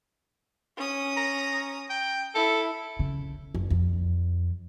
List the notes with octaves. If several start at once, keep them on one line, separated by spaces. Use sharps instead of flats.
C#4 D#6
A#5
G5
E4 A4
C#3
F#1
F2